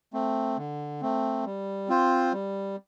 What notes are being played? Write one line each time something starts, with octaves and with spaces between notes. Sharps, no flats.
A3 C4
D3
A3 C4
G3
C4 F4 C5
G3